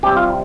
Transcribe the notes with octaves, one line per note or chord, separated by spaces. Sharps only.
C3 G3 C4 G4
F4